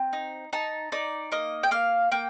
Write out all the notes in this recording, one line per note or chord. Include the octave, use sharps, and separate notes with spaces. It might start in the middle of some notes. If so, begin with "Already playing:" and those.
Already playing: C4
D#4
D#4 A5
D#4 D5
A#3 D#5
G5
A#3 F5
A#3 G5